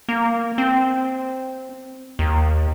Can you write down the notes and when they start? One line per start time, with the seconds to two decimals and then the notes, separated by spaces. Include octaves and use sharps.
0.09 A#3
0.58 C4
2.19 D#2